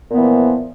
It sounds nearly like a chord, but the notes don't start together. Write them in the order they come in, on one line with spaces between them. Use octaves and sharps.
A#2 B3 E3 F3